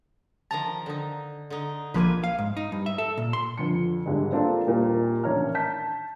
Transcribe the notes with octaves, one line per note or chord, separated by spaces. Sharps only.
D#3 F3 A5 A#5
D3 D#4
D3 D#4
A#1 F3 A#3 B4 G#5
F5
G#2
D#4
G2
E5
A4
A#2
C6
F2 D3 C#7
G#1 D3 G3 G#3
A#3 C4 D4 F4 A4
D#2 A#2 G3
A1 D#3 D4 C#5 A#5 F6
A5 G6 B6